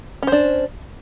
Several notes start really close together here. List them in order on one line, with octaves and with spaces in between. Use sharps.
C#4 C5 D4